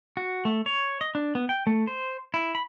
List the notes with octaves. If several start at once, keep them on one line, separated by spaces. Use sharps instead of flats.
F#4
A3
C#5
D#5
D4
B3
G5
A3
C5
E4
B5